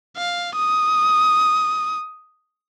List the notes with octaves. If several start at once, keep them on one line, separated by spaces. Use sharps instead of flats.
F5
D#6